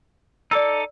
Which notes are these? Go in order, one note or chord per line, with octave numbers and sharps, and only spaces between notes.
D#4 A4 D5 D6 E6